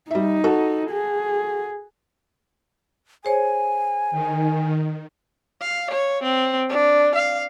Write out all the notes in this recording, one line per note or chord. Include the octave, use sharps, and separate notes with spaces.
G3 D#4 E5
F#4 A4
G#4
G#4 C5 C#5 G#5
D#3
F5
C#5
C4
D4
F5